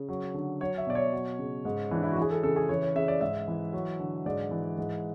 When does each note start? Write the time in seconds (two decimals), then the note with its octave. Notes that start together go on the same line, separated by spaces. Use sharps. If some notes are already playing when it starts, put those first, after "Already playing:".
Already playing: C#3
0.09 F#3
0.34 D3
0.60 F#3 C#5
0.78 E5
0.87 B2 D5
0.95 C#5
1.12 F#3
1.39 C#3
1.65 G#2
1.91 E3 D4
2.03 E4
2.12 F#4
2.17 E3 G#4
2.31 A4
2.43 C#3 A4
2.56 G#4
2.69 E3 C#5
2.82 C#5
2.95 C#3 E5
3.08 D5
3.21 G#2 E5
3.48 E3
3.73 F#3
3.99 D3
4.26 G#2 D5
4.51 E3
4.78 G#2